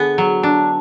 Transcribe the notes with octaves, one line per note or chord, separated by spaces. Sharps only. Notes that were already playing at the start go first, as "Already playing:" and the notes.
Already playing: D3 B3 G#4
F#3
D4